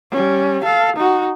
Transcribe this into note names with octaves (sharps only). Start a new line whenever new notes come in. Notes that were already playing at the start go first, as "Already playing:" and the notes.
G3 C#4
A4 F5
D#4 F#4